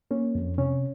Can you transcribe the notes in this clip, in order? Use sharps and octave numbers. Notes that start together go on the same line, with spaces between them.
A#3 C#4
F2
C3 C#4